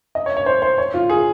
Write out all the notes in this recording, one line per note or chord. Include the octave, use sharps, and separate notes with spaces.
D#5
C#5
C#5
C5
C5
C#5
F4
G#4